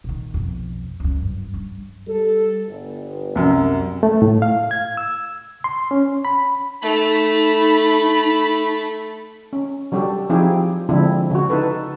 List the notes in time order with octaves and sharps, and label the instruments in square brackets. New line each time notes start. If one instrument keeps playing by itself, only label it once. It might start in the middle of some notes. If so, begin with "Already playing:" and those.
[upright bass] A#2 D#3
B1 F2
C#2 F#2
G2
G2
[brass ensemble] G3 A4
G1
[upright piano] C2 F#2
[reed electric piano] A3
A2
F5
G#6
E6
C6
C#4
B5
[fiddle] A3 [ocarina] D#4 [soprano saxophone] B5
[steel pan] C#4
F#3 G3 D4 F#4 G4 A4
F3 C4 D#4 E4 G4 G#4
D3 F3 G#3 C4 D4 E4
C#3 F#4
D#4 E4 A4 B4